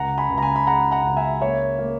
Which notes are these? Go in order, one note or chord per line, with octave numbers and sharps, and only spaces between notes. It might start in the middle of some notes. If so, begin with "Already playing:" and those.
Already playing: C#2 F#5 A#5
G#5 B5
C#2
A#5
G#5 B5
B5
G#3 F#5 A#5
F#5 A#5
C#2
E5 G#5
A#3 C#5 E5
A#3